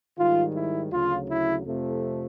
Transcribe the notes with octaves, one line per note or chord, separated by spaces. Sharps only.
G#2 D#3 G3 F4
E4
D2 C#3 F#3 F4
E4
F2 C3 F3 A3